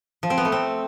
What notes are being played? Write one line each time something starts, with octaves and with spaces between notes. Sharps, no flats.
F3
C4
B3
A3
C4